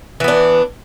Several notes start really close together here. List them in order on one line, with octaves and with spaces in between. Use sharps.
E3 B3 D4